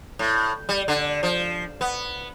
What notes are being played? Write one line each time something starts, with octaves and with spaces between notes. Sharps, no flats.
A2
G3
D3
F3
B3